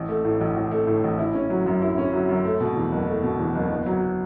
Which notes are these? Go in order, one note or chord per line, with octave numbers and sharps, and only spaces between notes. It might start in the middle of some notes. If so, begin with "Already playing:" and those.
Already playing: A1
A3
A2
A1
A1
A3
A2
A1
E4
C#4
F#3
F#2
E4
C#4
F#3
F#2
A3
B2
E2
F#1
A3
B2
E2
F#1
B3
F#3